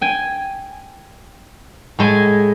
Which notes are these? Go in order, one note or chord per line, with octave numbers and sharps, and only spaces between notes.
G5 G#5
A2 G#3 G#5